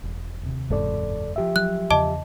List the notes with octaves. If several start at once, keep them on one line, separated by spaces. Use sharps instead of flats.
E1
D#2 C3
F#1 E2 G#2 C3 A4 D5
F3 G4 E5
F#3 F#6
E2 C#3 D#5 A5 D6